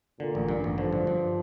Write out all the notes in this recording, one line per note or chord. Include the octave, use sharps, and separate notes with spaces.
A#2 D3
A1
G2
A1
D3 F3
G2
G2